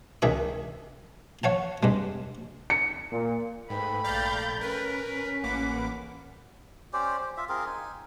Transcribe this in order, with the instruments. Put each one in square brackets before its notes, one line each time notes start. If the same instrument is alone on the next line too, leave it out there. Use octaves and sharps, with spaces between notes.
[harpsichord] C#2 D#3 G#4 E5 D6
C#5 F5 F#5 A5
G2 G#3
[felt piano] C#7
[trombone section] A#2
[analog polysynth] G#2 [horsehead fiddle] A3 B5 [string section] B4 [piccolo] G5
[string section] A#1 G6 A6 [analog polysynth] D5 F5 A#5
[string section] C#4 [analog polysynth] A#4 B4 [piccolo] B6
[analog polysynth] A1 A#3 D6 [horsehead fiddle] B4 F#5
[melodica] C#4 G4 C5 D5
C5
F4 E5
C4 F4 G#4 A#4
D#4 G#5